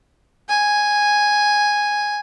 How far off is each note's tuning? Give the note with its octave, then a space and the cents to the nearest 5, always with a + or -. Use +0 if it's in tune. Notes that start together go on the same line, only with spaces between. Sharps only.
G#5 -5